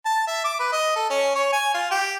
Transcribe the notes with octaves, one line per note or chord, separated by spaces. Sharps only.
A5
E5
D6
B4
D#5
A4
C#4
C#5
G#5
F4
G4